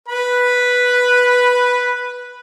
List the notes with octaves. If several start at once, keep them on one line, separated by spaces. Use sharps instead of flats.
B4 B5